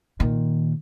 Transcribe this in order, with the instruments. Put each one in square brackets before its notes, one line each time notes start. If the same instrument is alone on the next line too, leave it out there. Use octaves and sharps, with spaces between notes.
[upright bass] A#2 D#3